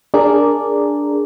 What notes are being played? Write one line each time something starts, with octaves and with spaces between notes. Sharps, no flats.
D4 G#4 A#4 D5